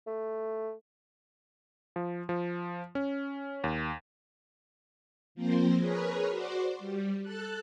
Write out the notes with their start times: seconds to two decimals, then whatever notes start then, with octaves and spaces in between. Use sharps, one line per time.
0.07 A3
1.96 F3
2.29 F3
2.95 C#4
3.64 D#2
5.35 F3 A#3 C4 C5
5.78 G#4 A#4 B4 C#5
6.30 F#4 C5 D5
6.79 G3
7.22 A4 A5 F#6